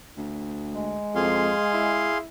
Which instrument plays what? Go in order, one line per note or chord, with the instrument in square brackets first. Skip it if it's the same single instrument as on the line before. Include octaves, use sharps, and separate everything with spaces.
[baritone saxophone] D2
[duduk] G#3
[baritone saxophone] F2 [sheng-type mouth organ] G#4 F5 C6
[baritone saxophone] E4